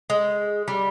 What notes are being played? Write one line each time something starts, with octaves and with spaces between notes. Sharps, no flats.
G#3
G3